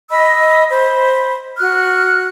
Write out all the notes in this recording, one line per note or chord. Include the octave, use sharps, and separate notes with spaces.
D#5 B5 E6
C5 B5
F#4 F6 F#6